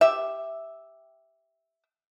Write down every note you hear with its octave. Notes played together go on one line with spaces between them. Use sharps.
G4 E5